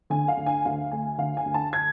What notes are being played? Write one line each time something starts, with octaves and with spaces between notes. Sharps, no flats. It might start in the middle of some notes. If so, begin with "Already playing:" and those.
D3 G#5
F5
D2
G#5
D2 F5
A3 G#5
D3 F5
G#5
D2
A5
G#6